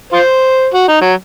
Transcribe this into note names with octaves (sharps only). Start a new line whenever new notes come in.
F4 C5
F#4
D#4
F#3